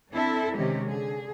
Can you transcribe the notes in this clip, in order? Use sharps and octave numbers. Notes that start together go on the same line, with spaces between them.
C4 D4 E4 A4
C3 D#3 G#3 C#4 G4
D3 G#4